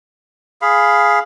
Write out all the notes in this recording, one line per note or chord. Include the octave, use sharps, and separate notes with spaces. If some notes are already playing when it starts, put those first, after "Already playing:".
G#4 F5 B5